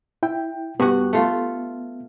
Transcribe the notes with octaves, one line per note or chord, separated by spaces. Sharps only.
E4 G5
G2 B3 F#4
A3 F4